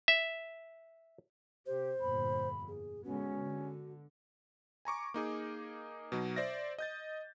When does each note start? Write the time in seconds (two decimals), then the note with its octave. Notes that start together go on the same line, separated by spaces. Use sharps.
0.08 E5
1.66 C3 G4 C5
2.01 G1 F2 A#2 B5
2.68 G#4
3.04 D3 G#3 B3 C#4 F#4
3.39 D3
4.85 G#5 A#5 C#6 D6
5.14 A#3 D#4 G#4
6.12 B2 F#3 D#4
6.36 C5 D5 E5 A#6
6.78 D#5 G6 A6